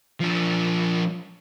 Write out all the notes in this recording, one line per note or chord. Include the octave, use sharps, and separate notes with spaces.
F3 D4